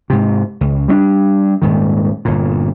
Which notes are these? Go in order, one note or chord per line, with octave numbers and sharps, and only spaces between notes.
G#2 C3
C#2
G3 C4 D4
D#1 G#2 D#3
G1 A#2